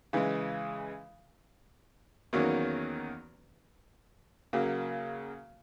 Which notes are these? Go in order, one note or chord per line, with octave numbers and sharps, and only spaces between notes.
C#3 E3 G#3
E2 D#3 F#3 A#3 C#4
C#3 F#3 A#3